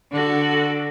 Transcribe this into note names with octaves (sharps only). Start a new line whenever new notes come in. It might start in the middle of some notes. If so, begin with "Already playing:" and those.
D3 F#4 A4